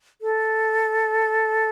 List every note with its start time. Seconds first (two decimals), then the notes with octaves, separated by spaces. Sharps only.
0.21 A4